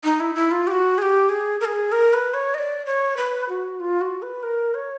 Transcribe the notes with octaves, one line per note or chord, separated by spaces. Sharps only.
D#4
E4
E4
F4
G4
F#4
G#4
G4
G#4
A#4
G#4
A#4
B4
C#5
D#5
D5
C#5
B4
F#4
F4
F#4
B4
A#4
C#5